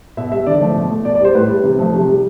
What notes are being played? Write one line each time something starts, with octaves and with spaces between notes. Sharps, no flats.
B2 E5
G3 E5
D3 D5
F3 A3
B2
A3
B2 D5
D5
G3 C5
A2 B4
G3
C3
F3 A3
C3
G3